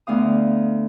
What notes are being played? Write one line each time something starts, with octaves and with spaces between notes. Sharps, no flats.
D2 B3 F5 D#6